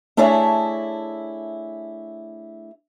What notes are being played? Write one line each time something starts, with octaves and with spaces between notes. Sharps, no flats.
A3 D4 E4 G#4 C#5 E5